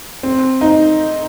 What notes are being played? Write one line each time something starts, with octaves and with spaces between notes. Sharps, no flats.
C4
D#4